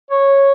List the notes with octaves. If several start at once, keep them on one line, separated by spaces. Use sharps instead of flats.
C#5